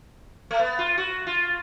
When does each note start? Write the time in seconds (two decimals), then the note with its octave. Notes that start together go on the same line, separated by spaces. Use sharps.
0.51 A3
0.60 B3
0.79 F4
0.98 F#4
1.27 F4